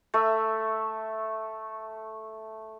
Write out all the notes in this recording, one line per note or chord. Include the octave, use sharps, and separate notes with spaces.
A3 E5